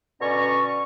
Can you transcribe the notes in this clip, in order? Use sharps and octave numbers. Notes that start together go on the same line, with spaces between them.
B2 D3 C#4 D5 A#5 C#6